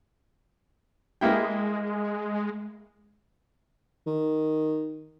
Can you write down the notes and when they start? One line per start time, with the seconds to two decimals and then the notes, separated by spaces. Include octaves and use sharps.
1.21 G#3 A#3 E4 G5
4.07 D#3